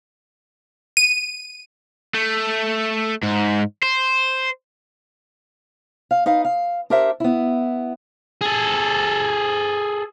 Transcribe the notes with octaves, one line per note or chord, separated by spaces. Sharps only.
D#7
A3
G#2
C5
F5
D#4 B4 F5
F5
D4 G4 A#4 C5 E5
B3 E4
G#4 A4